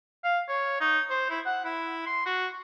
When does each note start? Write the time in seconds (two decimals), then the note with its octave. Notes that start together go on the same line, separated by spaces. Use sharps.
0.24 F5
0.49 C#5
0.81 D#4
1.10 C5
1.30 E4
1.46 F#5
1.65 E4
2.06 C6
2.26 F#4